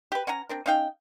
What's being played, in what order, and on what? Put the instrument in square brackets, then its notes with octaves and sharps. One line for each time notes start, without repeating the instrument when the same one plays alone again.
[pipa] G4 B4
C#4 F#5 G#5 A#5
C4 D4 A#4
C#4 D#4 F5 G5